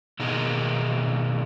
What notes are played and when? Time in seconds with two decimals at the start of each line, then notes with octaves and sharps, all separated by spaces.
0.20 B2 D#3 A#3 D#4 G#4